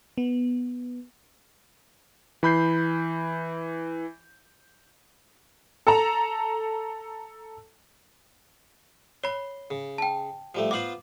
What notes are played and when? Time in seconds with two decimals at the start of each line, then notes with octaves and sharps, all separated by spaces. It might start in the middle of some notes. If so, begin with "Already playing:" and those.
0.18 B3
2.43 E3 B5 G6 C7
5.87 A4 A5 A#5
9.24 C#5 B5 C6
9.71 C#3
9.98 G5 A5
10.55 F3 G3 A3
10.71 B3 F4 C5 D6 F#7